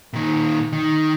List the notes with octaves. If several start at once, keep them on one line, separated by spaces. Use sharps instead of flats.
A#2 D#3
D#3